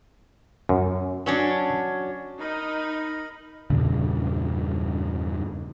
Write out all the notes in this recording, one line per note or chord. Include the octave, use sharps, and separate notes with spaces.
F#2
F#3 C#4 D4
D#4 A#4 D#5 B5
E2 G2 A#2 C#3